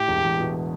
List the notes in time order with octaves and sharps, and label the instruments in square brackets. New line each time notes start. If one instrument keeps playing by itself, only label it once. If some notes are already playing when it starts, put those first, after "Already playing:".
Already playing: [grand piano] A2 [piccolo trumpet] G4
[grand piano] E1
E2
B2